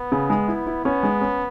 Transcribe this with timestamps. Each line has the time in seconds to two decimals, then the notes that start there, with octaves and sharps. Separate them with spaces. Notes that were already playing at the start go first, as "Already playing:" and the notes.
Already playing: B3
0.12 C#3
0.30 G#3
0.48 E4
0.67 E4
0.85 B3 C#4
1.03 G#3
1.21 C#4